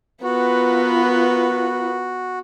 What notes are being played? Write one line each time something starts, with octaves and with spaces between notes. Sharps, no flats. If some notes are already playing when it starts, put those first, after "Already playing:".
B3 F4 F#4 A#4 B4